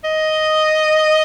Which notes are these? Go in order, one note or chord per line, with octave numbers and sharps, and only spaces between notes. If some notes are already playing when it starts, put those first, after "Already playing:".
D#5